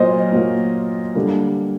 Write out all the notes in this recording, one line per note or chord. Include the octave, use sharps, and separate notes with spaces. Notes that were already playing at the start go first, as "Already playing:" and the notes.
Already playing: A#2 F#3 A#3 A#4 C5 D#5
A#2 F#3 A#3
D3 G3 A#3